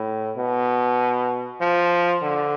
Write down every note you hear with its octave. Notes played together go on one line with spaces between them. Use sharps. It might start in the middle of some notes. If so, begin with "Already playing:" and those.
Already playing: A2
B2
F3
D3